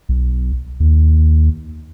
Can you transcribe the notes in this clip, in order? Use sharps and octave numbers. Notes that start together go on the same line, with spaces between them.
B1
D#2